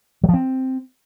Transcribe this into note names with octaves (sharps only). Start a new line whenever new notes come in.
F#3
F3
C4